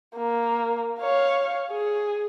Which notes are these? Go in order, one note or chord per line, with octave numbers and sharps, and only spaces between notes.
A#3
C#5 F5
G#4